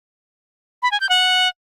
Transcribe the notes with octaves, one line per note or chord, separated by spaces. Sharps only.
B5
G#5
G6
F#5